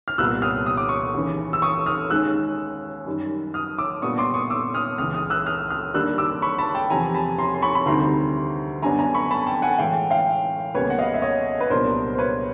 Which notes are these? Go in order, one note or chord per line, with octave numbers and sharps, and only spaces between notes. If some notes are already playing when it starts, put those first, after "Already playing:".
F6
C2 A#2 G3 B3 E6 F#6
D#6 F6
D#6
D6
C#6 D#6
D#2 C#3 E3
E6
C#6 D#6
D#6 F6
D#2 D#3 G#3 C#4 E6 F#6
F#2 D#3 G3
D#6 F6
D6 E6
A#2 G3 B3 D4 C#6 D#6
C6 D6
C#6 D#6
D6 E6
D#6 F6
C#2 C#3 E3 D#6 F6
D#6 F6
E6 F#6
D#6 F6
D#6 F6
D#2 D3 G3 A#3 D4 E6 F#6
D6 E6
B5 C#6
A5 B5
G5 A5
E2 C3 F3 G#5 A#5
A5 B5
A#5 C6
C6
B5 C#6
B5
D2 C3 D#3 G3 C4 A#5 C6
F#2 D3 G3 B3 D4 G#5 A#5
G#5 A#5
B5 C#6
A5 B5
G5 A5
F#5 G#5
A2 E3 G#3 F5 G5
F5 G5
C#2 B2 G3 A#3 C#4 B4 C#5
F#5
D#5 F5
E5
C#5 D#5
B4
C2 A#2 F#3 B3 D4 A#4 C5
C5
B4 C#5